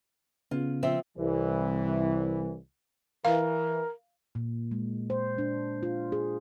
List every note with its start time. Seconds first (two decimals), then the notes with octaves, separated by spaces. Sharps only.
0.51 C#3 B3 F4
0.83 F3 C4 E5
1.17 C2 E3
3.25 E3 A#4 F5
4.35 A#2
4.71 G#3
5.10 C5
5.38 D4
5.83 F4
6.12 G#4